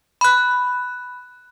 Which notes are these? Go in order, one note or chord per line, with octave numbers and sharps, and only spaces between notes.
B5 F#6